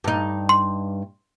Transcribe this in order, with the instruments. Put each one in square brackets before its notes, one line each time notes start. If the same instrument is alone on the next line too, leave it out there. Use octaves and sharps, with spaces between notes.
[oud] G2 D#4
[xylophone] C6